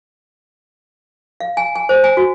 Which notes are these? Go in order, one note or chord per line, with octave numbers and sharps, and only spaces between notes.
F5
G#5
G#5
C5
G#5
F#4